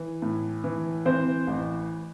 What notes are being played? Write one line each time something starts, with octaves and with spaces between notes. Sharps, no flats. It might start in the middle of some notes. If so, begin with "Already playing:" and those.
Already playing: E3
A2
E3
E3 C4 C5
A1